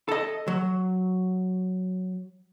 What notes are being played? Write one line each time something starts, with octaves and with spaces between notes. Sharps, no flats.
A4 D#5
F#3